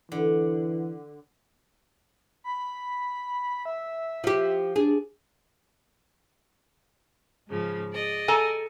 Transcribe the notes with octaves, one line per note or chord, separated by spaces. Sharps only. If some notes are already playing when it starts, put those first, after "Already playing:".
D3 E3
B5
E5
F3 G4
D4 G#4
G#2 C#3 F3
G#4 D5 D#5
A4 G#5 A#5